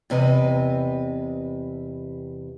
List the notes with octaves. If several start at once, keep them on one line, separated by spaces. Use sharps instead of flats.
E2 C3 B4 D#5